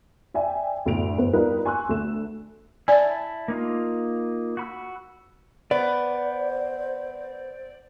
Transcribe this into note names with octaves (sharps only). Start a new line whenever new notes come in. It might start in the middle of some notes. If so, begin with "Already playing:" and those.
D5 E5 G5 G#5
F#1 D2 A2 B3 D7 F7
G1 E2 B4 C5
G3 D#4 F4 A#4 B4 D5
G#5 C6 C#6 E6 F#6
D2 A3 E7
E4 D5 E5 G#5 A5
A#3 D#4 F4
F#4 B5 E6
B3 C5 D5